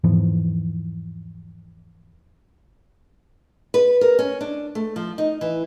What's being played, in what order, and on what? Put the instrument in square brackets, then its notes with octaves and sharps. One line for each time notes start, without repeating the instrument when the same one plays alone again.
[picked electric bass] E2 G#2 E3 F3
[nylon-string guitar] B4
A#4
C#4
D4
A3
F3
D#4
E3